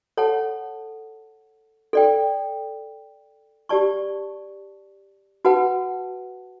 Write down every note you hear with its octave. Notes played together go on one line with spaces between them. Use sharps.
A4 C#5 F#5 A5
A4 D5 G5
G4 D5 A5 C#6
F#4 B4 F#5 A5